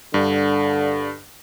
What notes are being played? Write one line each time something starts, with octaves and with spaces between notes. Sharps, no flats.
G2 D3